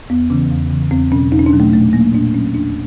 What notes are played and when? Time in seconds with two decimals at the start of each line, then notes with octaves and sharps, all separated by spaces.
0.10 E2 B3
0.30 C#3 E3 C#4
0.51 E2
0.71 C#3 E3
0.91 E2 C4
1.12 B2 F#3 C#4
1.32 E2 D#4
1.39 C#4
1.46 D4
1.53 B2 F#3
1.60 A3
1.73 A#2 A3
1.93 F#3 A#3
2.14 A#2 D4
2.34 F#3 C#4
2.54 E2 D4